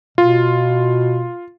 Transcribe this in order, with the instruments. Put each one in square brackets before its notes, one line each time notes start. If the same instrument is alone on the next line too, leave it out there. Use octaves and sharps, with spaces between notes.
[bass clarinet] B2 [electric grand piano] F4